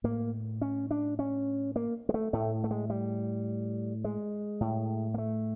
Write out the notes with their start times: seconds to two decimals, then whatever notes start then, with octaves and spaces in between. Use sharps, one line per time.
0.04 A2 A#3
0.62 C#4
0.91 D4
1.19 C#4
1.76 A#3
2.09 G#3
2.14 A3
2.33 A2 A3
2.64 A3
2.71 G#3
2.90 G3
4.04 G#3
4.61 A2
5.14 A#3
5.18 A3